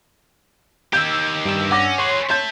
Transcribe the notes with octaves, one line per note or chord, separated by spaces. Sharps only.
D#3 G4 E6 G6 G#6
G2 E6
C#4 F#5 D6 A#6
G#4 B4 C#5 C6
E5 A5 G6